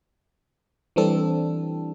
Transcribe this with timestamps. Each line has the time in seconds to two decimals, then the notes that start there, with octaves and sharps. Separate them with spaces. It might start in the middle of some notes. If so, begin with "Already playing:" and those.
0.96 E3 G3 C4 D4 A4